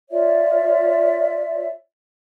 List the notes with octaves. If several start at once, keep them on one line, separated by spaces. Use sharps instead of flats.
F4 C#5 D5 E5